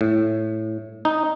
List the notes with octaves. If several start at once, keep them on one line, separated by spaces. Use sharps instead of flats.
A2
D#4